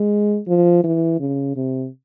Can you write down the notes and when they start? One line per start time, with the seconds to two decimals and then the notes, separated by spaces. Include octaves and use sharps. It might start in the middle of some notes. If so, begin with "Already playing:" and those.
Already playing: G#3
0.47 F3
0.84 E3
1.20 C#3
1.56 C3